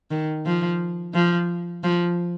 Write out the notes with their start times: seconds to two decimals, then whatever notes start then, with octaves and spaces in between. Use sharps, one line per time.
0.11 D#3
0.46 F3
1.14 F3
1.83 F3